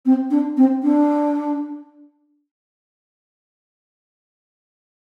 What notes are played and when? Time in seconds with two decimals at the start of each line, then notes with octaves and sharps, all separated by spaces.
0.05 C4
0.30 D4
0.57 C4
0.83 D4